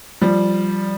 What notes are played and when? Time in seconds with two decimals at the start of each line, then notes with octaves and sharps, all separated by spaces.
0.22 F3 G3